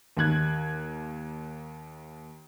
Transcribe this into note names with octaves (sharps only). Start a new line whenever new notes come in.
D#2 D#3 F#6 G#6